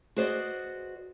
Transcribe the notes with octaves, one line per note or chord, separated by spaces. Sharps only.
F#4 G#4 B4 C5 D5 D#5